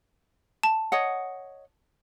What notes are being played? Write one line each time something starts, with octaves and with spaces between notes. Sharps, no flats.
A5
C#5 D#5 F#5